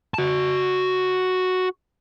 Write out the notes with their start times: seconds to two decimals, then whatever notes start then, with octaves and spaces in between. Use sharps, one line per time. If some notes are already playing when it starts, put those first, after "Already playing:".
0.14 F#4 A5